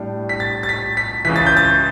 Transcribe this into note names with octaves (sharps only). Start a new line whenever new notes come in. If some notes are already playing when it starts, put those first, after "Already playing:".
Already playing: A2 G3 D4
B6
A6
A6
B6
B6
C#2 C#3 E3 B6
A6
G6
A6